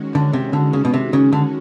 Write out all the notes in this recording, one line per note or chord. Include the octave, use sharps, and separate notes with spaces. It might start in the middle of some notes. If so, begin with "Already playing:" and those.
Already playing: D#3 G#3 C#4 F#4
D3
C3
D3
C#3
B2
C3
C#3
D3